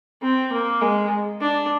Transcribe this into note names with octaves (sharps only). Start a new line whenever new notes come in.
C4
A#3
G#3
D4